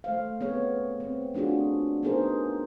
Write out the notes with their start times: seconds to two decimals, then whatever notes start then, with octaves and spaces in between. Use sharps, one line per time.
0.04 A3 C5 F5
0.41 B3 C4 G#4 C#5
1.00 C4
1.34 A3 D4 F4 F#4 G#4
2.03 B3 D#4 G#4 A#4 C5